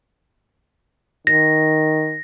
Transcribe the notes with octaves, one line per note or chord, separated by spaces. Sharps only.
D#3 A#6